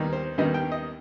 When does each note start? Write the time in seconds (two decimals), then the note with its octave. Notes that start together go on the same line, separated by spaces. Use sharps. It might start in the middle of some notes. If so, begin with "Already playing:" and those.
Already playing: D#2 D#3 G3 B3 D#4
0.13 C5
0.38 D#2 D#3 G3 B3 D#4 D#5
0.54 G5
0.72 D#5